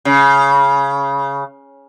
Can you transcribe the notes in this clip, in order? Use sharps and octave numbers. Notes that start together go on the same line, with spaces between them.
C#3